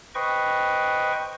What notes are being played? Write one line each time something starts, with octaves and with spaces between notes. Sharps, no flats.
B4 C5 D#5 G5 C#6